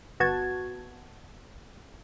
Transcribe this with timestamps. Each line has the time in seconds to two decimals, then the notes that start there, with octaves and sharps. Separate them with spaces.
0.20 G1 B3 F#4 A5 G#6